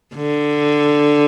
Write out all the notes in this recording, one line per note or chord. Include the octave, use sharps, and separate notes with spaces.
D3